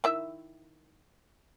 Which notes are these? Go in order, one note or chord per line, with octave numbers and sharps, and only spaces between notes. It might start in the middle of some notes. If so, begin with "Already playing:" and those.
D#3 E4 E5